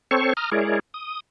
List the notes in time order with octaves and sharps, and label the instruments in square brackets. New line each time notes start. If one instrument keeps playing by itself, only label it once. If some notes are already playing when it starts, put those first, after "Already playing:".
[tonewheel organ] C4 A4 C5 C#5 C#6
A#5 D#6 F6
G#3 E4 G#4 A#4 C#5 D5
D#6